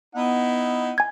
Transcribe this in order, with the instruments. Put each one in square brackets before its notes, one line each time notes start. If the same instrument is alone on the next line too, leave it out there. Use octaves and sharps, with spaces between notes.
[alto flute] B3 [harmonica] D#4 E4 F#5
[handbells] G#5 G#6